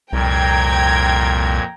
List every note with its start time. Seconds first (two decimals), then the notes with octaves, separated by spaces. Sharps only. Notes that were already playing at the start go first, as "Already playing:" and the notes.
0.13 C2 F2 A#2 G5 A#5 G#6